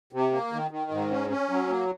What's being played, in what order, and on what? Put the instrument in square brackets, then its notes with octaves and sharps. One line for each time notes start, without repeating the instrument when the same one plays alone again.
[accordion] C3
A#3
D#3
D#3
G#2
C#4
C#4
F#3
A#3